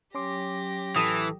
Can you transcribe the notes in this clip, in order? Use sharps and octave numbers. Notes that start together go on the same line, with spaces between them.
F#3 C#4 G4 C6 D6 A#6
A1 E3 A4 D#6